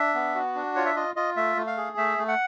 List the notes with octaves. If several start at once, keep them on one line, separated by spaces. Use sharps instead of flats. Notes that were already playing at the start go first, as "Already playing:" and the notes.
Already playing: D4 E5
B3
F#4
D4
F4 C#5
E5
F4 D#5
F4 D#5
A3 E5
A3
F5
G#4
A3 E5
A3
F#5